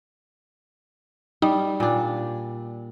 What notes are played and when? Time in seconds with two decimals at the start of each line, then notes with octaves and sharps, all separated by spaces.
1.42 G3 D#4
1.80 A#2 D4